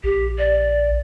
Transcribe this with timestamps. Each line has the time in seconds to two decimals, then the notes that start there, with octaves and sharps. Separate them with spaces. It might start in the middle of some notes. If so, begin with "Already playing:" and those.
0.04 A#1 G4
0.38 D5